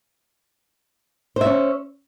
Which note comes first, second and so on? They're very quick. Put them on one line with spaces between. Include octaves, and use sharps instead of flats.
C5 E5 C#4